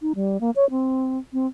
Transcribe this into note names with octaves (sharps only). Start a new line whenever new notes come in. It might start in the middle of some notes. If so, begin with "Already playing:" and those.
D#4
G3
A#3
C#5
C4
C4